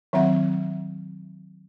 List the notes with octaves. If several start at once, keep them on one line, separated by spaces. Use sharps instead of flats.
D#3 F#3 C4 E5 F#5